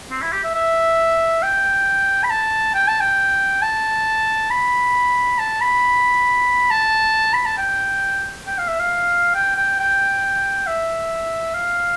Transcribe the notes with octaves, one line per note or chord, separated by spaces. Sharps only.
C4
E4
G4
E5
E5
G5
B5
A5
G5
A5
G5
A5
B5
A5
B5
A5
B5
A5
G5
G5
F5
E5
F5
G5
G5
G5
E5
F5